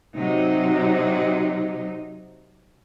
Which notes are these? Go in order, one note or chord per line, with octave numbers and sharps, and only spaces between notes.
C3 F#3 D#4